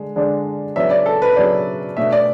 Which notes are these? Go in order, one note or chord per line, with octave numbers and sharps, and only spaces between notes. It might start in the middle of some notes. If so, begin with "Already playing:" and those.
Already playing: D3 G#3
D3 G#3 D4
C#3 F#3 B3 D4 E5
D5
A4
B4
C#3 F#3 B3 D4 D5
B2 A3 D4 E5
D5